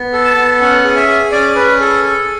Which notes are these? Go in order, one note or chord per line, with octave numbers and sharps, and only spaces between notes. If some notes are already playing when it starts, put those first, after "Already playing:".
Already playing: B3
A4
A5
B3
C#4 F#5
G#4
E5
G#4
C#4 D5
C#4 B4
G#4 A4
A4